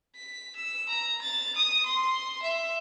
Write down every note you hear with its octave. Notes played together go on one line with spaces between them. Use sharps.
B6
E6
A#5
A6
D#6
C6
E5